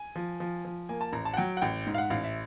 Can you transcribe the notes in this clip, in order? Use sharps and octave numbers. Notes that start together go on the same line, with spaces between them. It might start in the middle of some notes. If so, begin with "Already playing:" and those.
Already playing: G#5
F3
F3
F3
A#3 G#5
A5
A1 A#5
A5
F#5
F#3 G5
F#5
A1 G5
G#2
F5
F#5
A1 F5
E5